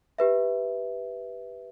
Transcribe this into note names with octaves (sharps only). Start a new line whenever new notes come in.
G4 B4 E5